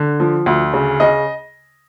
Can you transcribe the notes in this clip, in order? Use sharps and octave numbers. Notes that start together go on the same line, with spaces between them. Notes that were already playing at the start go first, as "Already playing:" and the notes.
Already playing: D3
F3
D2
C#3
C#3 D#5